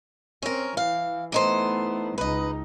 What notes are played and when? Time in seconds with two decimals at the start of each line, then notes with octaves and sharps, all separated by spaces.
0.42 C4 C#4 A#4
0.77 E3 F5
1.32 E3 A3 B3 D#4 C5
2.18 C#2 D#4 B4 D#5